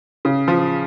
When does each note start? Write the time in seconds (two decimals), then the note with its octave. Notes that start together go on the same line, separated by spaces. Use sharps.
0.25 C#3
0.48 F3